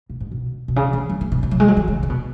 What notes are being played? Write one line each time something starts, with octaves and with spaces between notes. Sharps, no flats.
B2
G#2
B2
B2
C#3
E3
F#3
E3
B2
C#3
F#3
G#3
F#3
E3
C#3
C#3
B2